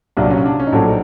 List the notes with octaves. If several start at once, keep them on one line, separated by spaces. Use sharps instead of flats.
C2 A#2 F#3 D4
C#4
D4
C#4
D#4
A#1 A2 F#3 A3 D4